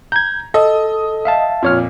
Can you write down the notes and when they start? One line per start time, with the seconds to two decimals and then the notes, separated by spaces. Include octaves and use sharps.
0.12 A#5 G6 G#6
0.54 A4 D#5
1.25 E5 F5 A5
1.63 F2 A#2 F4 C#5 F6